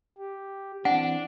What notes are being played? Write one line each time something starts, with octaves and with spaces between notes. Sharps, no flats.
G4
E3 C4 D4 F#5